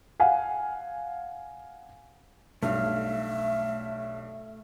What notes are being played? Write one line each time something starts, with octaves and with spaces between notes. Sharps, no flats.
F5 F#5 G#5
B1 G2 A3 E5 F5